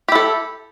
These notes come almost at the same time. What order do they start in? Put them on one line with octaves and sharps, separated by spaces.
G4 E4 A4